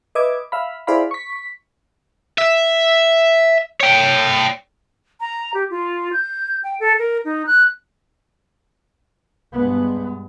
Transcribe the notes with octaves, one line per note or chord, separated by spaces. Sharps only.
B4 D#5 E5 D6 G#6
E5 F5 B5
E4 G#4 C5 D5 F5 B5
C#6 B6
E5
C#5 G5
A#5
G4
F4
G6
G5
A4
A#4
D#4
F#6
G2 G#3 B3